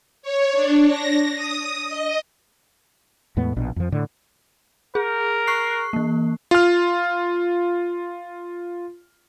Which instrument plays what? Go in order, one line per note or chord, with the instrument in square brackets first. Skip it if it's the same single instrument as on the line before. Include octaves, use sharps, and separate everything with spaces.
[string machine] C#5
D4
A#6
D#6
D#5
[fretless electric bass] E2 A2 G#3 B3
A#1 B2 D4
F2 F3
A2 D3
[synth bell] G#4 [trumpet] A#4
[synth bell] C#6 F#6 C7
E3 A#3
[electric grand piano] F4 F6